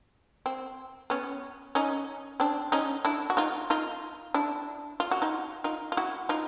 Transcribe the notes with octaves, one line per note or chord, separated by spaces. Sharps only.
C4
B3 C#4
C#4 D#4
C4 D4
C#4 D#4
D4 E4
F#4
D#4 F4
D#4 F4
D4 E4
F4
F#4
D#4 F4
D#4 F4
F4
E4 F#4
D#4 F4